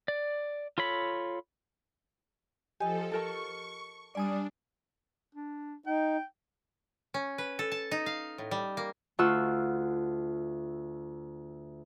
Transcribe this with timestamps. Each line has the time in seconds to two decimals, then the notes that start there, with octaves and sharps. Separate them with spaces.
0.08 D5
0.78 F4 A4 C#5 B5
2.80 F3 G4 A4 D#5 G#5
3.12 A4 A#4 A5 C#6
4.15 G3 D4 D5 G#5 D#6
5.35 D4
5.87 D#4 G5
7.14 C#4
7.38 B4
7.59 A4
7.72 A5
7.91 D#4
8.06 F5
8.38 A2
8.51 G3
8.77 A#3
9.19 D2 F4 F5 F#5 C#6 E6